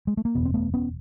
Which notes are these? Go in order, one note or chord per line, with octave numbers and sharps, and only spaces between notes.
G#3
A3
A#3
F#1 E2 B2 B3
C4
A3 B3
B3 C#4